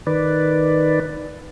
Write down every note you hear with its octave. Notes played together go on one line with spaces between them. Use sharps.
D#3 B4 D5